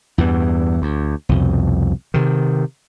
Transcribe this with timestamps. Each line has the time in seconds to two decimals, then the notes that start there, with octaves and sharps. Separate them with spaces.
0.18 E2 G2 E3
0.82 D2
1.29 C2 F2 B2
2.14 C3 D#3